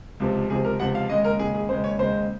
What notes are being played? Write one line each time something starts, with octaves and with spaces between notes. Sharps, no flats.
C#2 C3 F3
C#2 C3 F3 G#4
A#4
C#2 C3 F3 F#5
F5
D#2 C#3 G#3 D#5
A#4
D#2 C#3 G#3 G#4
G#4
D#2 C#3 G#3 C5
C#5
D#2 C#3 G#3 C5